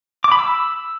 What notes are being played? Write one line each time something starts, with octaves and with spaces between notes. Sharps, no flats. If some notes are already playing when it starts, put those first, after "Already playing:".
D6
B5
E6